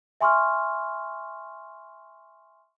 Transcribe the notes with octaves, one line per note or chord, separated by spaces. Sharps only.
E5 G#5 C6 C#6 D#6 F6